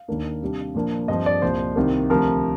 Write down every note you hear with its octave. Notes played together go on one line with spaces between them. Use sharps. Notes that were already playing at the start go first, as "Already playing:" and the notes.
Already playing: F5
D#2 D#3 A#3 D4
C3 G3 D4
A#2 F3 A#3 D4
G2 F3 C4 D#5
D5
C2 A#2 F3 C5
C2 C3 D#3 A#3
D2 C3 F3 A#4